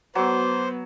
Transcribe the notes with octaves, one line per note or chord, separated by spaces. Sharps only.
F#3 B3 C5 D6